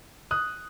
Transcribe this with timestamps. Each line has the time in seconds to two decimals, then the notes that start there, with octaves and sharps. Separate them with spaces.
0.31 D#6 F#6